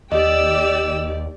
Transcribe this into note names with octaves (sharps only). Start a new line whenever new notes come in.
D#2 G4 D5 D#5 G5 E6